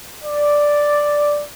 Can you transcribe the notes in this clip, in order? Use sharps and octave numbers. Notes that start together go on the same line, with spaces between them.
D5